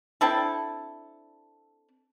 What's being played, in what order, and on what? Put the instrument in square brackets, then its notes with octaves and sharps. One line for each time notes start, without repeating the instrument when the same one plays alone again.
[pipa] C4 D4 E4 A4